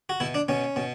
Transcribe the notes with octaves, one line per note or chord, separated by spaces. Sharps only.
F#4
B2 E4
D4
B2 C#4
B2